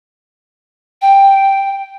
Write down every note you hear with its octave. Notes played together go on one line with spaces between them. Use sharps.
G5